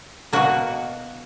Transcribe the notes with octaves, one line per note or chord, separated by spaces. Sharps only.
B2 A#3 F#4